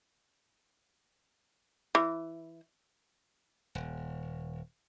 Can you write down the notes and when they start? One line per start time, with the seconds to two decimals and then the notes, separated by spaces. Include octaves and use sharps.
1.95 E3
3.75 D#1